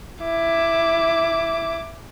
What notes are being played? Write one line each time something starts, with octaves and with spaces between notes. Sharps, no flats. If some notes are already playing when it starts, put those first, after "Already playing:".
E4 D6